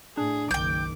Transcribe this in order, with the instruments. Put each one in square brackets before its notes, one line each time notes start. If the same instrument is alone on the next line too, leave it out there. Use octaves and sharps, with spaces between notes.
[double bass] A2 [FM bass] D4 [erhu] G#4
[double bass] F#1 D#3 [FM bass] B1 [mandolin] G5 G6 [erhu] D6